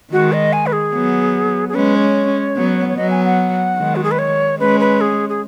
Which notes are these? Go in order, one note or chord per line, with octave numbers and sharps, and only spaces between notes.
D#3 G#3 F#4
D#5
G#5
B4
G#4
F#3 B3
G#4
G#3 C#4 B4
C#5
F#3 B3
C#5
F#3 B3 D#5
G#5
F#5
D#3 G#3
F#4
G#4
B4
C#5
G#3 C#4 B4
B4
G#4
G#4